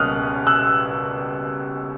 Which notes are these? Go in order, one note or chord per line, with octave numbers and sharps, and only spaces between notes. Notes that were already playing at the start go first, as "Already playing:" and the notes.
Already playing: C#2 B2 G3 A#3 C#4 D#6 F6 F#6
E6 F#6